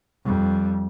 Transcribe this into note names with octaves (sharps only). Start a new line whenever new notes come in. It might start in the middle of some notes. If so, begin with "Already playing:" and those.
F2 G3